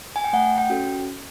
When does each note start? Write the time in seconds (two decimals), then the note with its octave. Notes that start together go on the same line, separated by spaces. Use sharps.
0.16 G#5
0.24 G5
0.33 A3 F#5
0.58 G5
0.70 C#4 F#4 A4